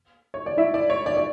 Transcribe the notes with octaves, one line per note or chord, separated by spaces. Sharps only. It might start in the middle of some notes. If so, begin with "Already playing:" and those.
C#5
D5
E4 E5
D5
C#5
D5
D5